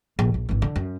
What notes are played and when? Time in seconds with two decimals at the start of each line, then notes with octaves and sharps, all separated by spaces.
0.19 A#1
0.34 A#1
0.49 G#1 E3
0.62 D3
0.76 F#2